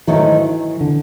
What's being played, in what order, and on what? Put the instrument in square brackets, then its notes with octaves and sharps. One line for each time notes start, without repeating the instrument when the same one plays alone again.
[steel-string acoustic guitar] G#2 D#3 F#3 A3 [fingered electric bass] E3
[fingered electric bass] D3